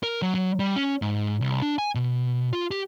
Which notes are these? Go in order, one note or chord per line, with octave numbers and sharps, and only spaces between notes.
A#4
F#3
F#3
G3
C#4
G#2
C2
D4
G#5
B2
F4
G4